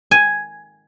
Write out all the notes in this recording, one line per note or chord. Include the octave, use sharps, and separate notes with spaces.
G#5